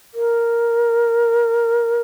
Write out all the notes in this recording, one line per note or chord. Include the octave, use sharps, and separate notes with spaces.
A#4